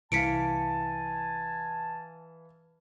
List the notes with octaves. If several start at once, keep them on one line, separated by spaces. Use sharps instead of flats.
C2 E3 F5 G#5 A5 B6 C#7 D7